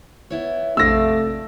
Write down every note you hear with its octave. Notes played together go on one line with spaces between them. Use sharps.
B3 E4 C#5
A#1 F2 C3 A3 D5 F5 E6 A#6